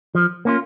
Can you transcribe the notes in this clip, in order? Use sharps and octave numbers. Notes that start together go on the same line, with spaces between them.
F3
A#3 C#4 F4